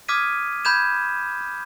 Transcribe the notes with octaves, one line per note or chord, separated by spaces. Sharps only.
D6 D#6 F6 G#6 B6 D#7
B5 G6 G#6 E7